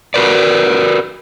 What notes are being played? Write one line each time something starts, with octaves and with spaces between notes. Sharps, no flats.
F#4 A#4 B4 D5